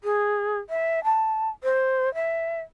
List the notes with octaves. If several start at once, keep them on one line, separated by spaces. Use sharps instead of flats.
G#4
E5
A5
C5
E5